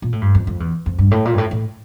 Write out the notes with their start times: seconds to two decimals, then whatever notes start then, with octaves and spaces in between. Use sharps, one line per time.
0.02 A#2
0.12 A2
0.21 G2
0.35 F2
0.47 F2
0.60 E2
0.86 F2
0.99 G2
1.11 A2
1.25 A#2
1.33 G2
1.38 A2
1.51 A2